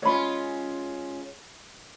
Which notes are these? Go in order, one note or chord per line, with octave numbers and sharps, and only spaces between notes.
G#3 C#4 F4 C#5 B5